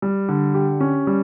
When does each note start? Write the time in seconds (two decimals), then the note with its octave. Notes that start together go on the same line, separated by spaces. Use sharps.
0.02 G3
0.29 D3
0.54 G4
0.80 C#4
1.07 G3